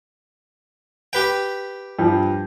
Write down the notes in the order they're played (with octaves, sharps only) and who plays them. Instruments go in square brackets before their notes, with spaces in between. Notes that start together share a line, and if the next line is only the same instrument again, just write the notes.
[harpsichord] G4 B4 G5
[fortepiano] G2 F3